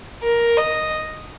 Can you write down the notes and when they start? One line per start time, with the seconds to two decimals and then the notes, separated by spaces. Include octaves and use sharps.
0.23 A#4
0.57 D#5